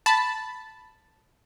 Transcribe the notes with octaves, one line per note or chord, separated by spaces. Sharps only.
A5 B5